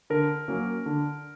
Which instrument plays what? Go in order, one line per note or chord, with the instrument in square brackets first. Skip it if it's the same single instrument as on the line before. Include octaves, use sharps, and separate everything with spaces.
[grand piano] D3 [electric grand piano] A#4
[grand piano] F#3 A#3 C#4
D3